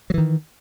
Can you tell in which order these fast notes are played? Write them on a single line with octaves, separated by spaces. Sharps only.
F#3 E3 D#3